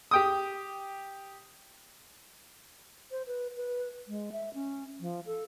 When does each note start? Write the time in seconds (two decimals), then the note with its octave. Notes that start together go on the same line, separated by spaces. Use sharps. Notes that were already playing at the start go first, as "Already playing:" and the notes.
0.11 G4 G5 D#6
3.11 C5
3.27 B4
3.57 B4
4.08 G#3
4.32 E5
4.54 C#4
5.00 F3
5.26 A4